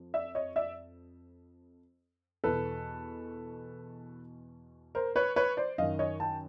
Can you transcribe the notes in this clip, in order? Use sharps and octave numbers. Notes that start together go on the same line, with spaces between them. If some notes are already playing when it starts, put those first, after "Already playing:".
Already playing: F2
D5 E5
C#5 D#5
D5 E5
E2 B2 A4 B4
A#4 C5
B4 C#5
B4 C#5
C5 D5
F#2 D#3 D#5 F5
C#5 D#5
G5 A5